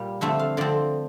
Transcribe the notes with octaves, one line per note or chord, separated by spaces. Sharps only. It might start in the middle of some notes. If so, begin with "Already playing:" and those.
Already playing: A#2 G3 A#3
D3 F3 A3 C4 E5
F5
D3 F3 C4 D5